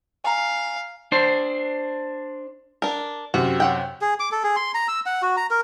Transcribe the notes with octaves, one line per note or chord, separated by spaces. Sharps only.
F5 G#5 A#5
D4 C5
D4 A#4
F#2 C3 F#4
C#5 F#5 G5
G#4
D6
A4
G#4
C6
A#5
E6
F#5
F#4
A#5
A#4